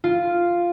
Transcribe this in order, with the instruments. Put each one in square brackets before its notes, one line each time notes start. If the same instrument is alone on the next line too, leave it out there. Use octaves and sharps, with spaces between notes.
[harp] F4